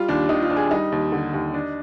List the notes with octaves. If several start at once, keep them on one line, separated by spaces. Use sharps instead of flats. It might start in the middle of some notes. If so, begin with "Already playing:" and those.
Already playing: G3 F4
D#2 D4
D#3 D#4
F4
D4
G#4
G3 D#4
D#2
D3
D#2
D4